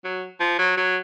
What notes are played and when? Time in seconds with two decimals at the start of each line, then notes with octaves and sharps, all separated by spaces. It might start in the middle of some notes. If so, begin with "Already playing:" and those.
0.04 F#3
0.40 F3
0.59 F#3
0.77 F#3